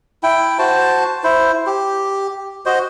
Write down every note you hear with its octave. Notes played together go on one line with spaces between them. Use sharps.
E4 G5
F#4 C5 A5
E4 C5
G4
F#4 C5 D#5